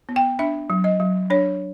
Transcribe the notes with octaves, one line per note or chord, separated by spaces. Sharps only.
B3
G5
D4 E5
F#3
D#5
F#3
D4 C#5